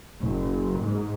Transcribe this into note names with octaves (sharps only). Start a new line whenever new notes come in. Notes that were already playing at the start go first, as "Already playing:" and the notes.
F#1
G#2